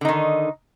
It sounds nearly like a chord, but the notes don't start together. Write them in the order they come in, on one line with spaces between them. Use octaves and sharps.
D3 D#4 D#3